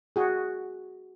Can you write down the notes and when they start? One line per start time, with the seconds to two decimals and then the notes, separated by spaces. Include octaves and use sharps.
0.16 F#4 G#4